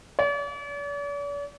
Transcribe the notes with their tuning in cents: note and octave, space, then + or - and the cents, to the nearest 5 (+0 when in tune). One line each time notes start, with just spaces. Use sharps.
D5 -45